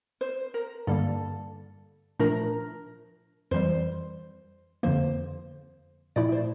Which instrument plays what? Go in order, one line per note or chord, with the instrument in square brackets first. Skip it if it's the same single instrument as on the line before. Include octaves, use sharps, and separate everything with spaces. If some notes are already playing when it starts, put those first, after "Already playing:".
[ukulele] C5
A#4
[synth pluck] G2 D3 G3 A#3 [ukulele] A4
[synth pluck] A#2 F3 A3 D4 [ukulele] A#4
[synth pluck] F2 E3 G3 [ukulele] C5
[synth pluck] F2 D3 F3 A#3 [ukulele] C5
[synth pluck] A#2 F3 A3 E4 [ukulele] D5
[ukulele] C5